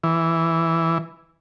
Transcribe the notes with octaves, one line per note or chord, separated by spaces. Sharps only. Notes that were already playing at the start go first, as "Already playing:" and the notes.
E3